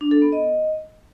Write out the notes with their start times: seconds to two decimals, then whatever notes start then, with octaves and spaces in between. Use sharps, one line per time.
0.01 D4
0.11 A4
0.22 B3
0.32 D#5